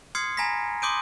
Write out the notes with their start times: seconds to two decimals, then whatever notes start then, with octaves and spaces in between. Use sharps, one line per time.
0.15 C6 D#6 F6 G#6 C7 C#7
0.37 G#5 A#5 B5 A#6 B6
0.82 C6 D6 D#6 G6 D7 D#7